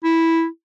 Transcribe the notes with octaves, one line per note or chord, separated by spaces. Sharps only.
E4